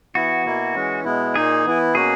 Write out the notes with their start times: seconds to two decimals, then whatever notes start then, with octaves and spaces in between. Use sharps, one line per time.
0.15 E3 B3 E4 F#4
0.45 B2 A#3 E4
0.75 E3 G#3 C#4
1.05 B2 G#3 B3 E4
1.36 A#2 A#3 D#4 G#4
1.65 E3 B3 E4
1.95 B2 A#3 C#4 F#4 G#4